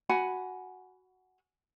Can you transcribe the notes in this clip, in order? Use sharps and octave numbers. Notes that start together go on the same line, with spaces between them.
F#4 F#5 G#5 B5